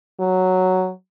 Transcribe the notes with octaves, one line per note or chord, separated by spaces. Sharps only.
F#3